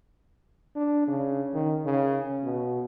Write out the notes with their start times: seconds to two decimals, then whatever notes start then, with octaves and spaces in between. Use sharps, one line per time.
0.76 D4
1.08 C#3
1.54 D#3
1.85 C#3
2.43 B2